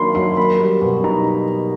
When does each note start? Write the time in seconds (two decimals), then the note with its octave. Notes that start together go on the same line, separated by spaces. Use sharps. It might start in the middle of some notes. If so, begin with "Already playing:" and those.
Already playing: D#3 F#3 A#3 D4 B5 C6
0.15 F#3 C6
0.37 A#3 B5
0.59 G3
0.82 B2
1.04 D#4 A#5